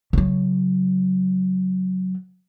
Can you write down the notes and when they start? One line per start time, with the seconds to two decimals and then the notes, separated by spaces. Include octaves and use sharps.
0.13 C#3 F#3